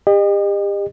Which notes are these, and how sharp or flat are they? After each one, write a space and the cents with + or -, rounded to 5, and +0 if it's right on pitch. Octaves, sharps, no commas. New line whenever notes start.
G4 +35 D#5 -35